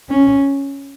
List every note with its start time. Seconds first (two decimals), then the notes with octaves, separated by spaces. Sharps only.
0.10 C#4